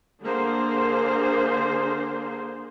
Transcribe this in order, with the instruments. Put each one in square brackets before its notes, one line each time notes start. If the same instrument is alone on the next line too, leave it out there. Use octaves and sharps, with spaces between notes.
[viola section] D3 A#3 G#4 C5